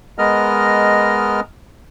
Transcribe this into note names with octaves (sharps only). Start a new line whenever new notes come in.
G#3 B3 A#4 D#5 F6